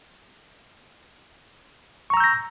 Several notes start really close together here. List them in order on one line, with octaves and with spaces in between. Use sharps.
C#6 A#5 E6 G6 A#6